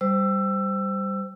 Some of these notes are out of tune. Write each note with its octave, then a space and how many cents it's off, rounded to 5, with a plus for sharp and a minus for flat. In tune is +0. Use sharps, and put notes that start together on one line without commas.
G3 +0 C5 -15 E6 +20